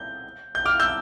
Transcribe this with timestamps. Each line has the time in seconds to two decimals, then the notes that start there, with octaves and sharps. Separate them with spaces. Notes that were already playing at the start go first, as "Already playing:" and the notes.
Already playing: G6
0.55 G6
0.65 D6 F6
0.80 E6 G6